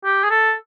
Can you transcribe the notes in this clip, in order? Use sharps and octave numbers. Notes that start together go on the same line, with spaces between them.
G4
G#4
A4